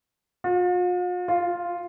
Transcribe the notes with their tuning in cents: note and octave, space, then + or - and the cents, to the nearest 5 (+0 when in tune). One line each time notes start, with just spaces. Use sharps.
F4 +45
F4 +0